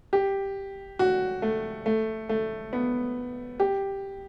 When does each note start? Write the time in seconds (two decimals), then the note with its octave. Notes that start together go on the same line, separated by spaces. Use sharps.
0.13 G4
0.99 F#4
1.42 A3
1.86 A3
2.29 A3
2.73 B3
3.60 G4